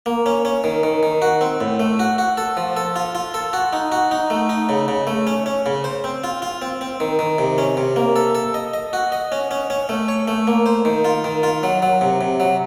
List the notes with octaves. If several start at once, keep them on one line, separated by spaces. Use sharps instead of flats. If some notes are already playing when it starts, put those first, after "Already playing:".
A#3
C#4
C#4
D#3
D#3
D#3
F#4
C4
A2
A3
F#4
F#4
A4
F3
A4
F4
F4
A4
F#4
D#4
F#4
D#4
A3
D#4
C#3
C#3
A3
C#4
C#4
C#3
C5
C4
F4
F4
C4
C4
D#3
D#3
C3
C#4
C3
A#3
A4
A4
D#5
D#5
F#4
D#5
C#4
C#4
C#4
A3
C#5
A3
A#3
C5
D#3
F4
D#3
F4
F#3
F#3
C3
C3
F#3